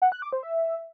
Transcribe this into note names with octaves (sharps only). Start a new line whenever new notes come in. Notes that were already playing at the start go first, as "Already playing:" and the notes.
F#5
F#6
D6
C5
E5